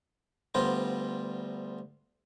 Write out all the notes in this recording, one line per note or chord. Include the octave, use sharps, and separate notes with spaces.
D2 G3 B3 F4 C5 A#5